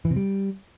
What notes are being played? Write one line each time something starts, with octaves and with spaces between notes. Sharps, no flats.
E3
C3
G3